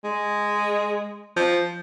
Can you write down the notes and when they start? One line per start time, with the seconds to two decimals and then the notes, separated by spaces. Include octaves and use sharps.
0.04 G#3
1.36 F3